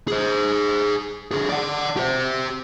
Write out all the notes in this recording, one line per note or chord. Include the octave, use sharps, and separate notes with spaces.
G#4 C5
D3 G#4
D5 F#5
G4 C5